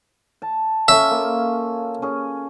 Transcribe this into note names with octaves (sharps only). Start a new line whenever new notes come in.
A5
C#4 F4 A4 E5
A#3
C#4 G#4